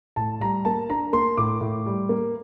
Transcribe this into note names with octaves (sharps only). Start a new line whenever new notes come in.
A2 A5
G3 A#5
A#3 A5
D4 A#5
A#3 C6
A2 D6
A2
G3
A#3